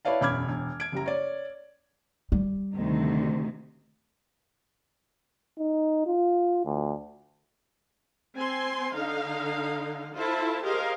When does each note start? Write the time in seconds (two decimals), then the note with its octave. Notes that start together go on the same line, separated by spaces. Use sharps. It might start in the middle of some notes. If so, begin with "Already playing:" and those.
0.05 E4 B4 C#5 D5 F5 A5
0.21 E1 F#2 B5 D6 F6 G#6
0.48 E1
0.80 G#6 D7
0.92 F#1 G3 A#5
1.06 C#5 D5
2.32 G3
2.74 D2 C3 D#3
5.59 D#4
6.06 F4
6.65 D2
8.36 C4 G#5 C6
8.95 D3 D#4 F5
10.15 E4 F4 A4 C5 A5
10.62 G4 G#4 A#4 C5 D#5 F5